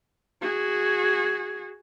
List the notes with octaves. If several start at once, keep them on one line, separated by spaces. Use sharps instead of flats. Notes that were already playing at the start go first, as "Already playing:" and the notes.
F#4 G#4